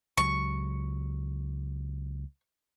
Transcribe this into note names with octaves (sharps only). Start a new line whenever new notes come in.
C#2 F#3 C#6